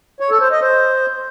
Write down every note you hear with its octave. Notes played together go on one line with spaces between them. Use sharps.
C#5
A4
C5
D#5
C5